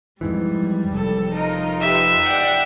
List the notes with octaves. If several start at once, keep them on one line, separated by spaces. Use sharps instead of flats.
F2 G#2 E3 G3
F1 A4
D#4 F4 A#4 D#5
G4 B4 E5
D5 F#5 G5